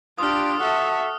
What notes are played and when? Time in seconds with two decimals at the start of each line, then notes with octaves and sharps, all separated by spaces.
0.18 D4 F4 G4 D#6 F6
0.60 F#4 A4 E5